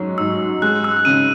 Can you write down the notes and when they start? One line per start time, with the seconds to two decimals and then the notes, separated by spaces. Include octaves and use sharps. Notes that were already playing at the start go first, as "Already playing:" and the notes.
Already playing: G#2 F#3 C#4
0.18 G#2 E6
0.62 G#3 F#6
0.84 E6
1.05 C#3 D#7